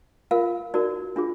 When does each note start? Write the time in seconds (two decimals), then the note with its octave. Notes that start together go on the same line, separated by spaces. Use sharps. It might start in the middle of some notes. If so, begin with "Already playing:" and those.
0.31 F4 A#4 F5
0.74 D#4 F#4 A#4 D5
1.16 D4 F4 G#4